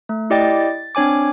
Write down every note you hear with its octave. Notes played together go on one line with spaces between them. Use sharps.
A3
E4 G4 D5 D#5 G5 A6
A6
C4 D4 C#5 G#5 D6